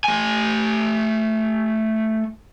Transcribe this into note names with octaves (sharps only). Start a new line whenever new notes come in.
A3 G#5